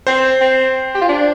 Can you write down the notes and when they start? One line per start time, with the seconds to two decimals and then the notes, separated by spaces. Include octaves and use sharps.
0.07 C4 C5
0.41 C4
0.95 G4
1.01 F4
1.09 D4